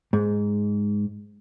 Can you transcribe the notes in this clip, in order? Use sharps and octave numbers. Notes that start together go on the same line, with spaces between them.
G#2